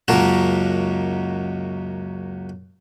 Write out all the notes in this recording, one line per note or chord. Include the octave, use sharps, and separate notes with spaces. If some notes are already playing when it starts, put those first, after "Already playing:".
C#2 F#2 A#3 F#4 A#4 A5